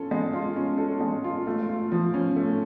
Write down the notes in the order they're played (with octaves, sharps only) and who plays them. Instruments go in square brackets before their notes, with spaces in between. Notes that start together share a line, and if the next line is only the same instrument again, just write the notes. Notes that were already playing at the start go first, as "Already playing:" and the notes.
Already playing: [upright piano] C#4 F4 A4
G#3
F4
C#4
A4
G#3
F4
A3
F4
F3
C#4
A3